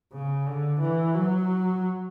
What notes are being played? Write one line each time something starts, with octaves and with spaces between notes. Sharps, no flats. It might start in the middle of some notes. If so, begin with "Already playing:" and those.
C#3
D3
E3
F#3